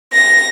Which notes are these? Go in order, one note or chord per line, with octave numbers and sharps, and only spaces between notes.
A#6